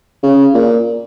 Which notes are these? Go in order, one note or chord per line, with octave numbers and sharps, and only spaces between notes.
C#3
A#2